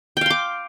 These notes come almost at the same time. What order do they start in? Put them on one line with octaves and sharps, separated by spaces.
G5 F5 C6 D6